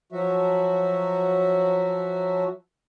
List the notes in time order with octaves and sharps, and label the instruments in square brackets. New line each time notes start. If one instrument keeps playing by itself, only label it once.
[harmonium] F3 F#3 F#4 E5